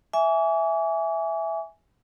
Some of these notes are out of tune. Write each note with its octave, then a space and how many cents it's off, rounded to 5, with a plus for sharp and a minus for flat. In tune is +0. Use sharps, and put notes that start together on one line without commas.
E5 +0 G#5 +0 D6 -45